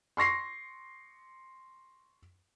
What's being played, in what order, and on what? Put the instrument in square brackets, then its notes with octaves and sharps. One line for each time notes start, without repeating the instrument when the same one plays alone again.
[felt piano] C6 C#6 A#6 C7